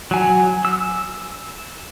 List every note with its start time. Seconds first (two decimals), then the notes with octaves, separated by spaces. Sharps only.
0.11 F#3 G#5
0.65 E6